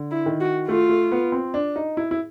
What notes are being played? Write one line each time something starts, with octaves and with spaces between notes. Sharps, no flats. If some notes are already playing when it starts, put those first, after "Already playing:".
Already playing: D3
E4
D#3
F#4
A3 F4
A3
B3
C4
D4
D#4
E4
E4